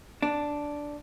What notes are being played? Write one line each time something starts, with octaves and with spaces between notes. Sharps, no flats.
D4